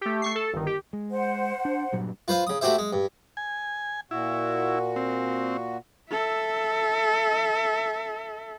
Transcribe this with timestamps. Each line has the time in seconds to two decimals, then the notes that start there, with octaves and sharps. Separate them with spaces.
0.01 A3 G4
0.22 A3 C#6 C7
0.35 A4
0.53 G1 D#3
0.66 G4
0.93 G#3
1.10 C5 F#5
1.65 D4
1.93 G2 A#2 F#3
2.28 F4 B4 C5 F5
2.47 C#3 D#6
2.61 A3 F#4 G4 C5 E5
2.78 G#3
2.93 G2
3.37 G#5
4.11 A#2 E4 F#4
4.96 C4
6.10 A4 E5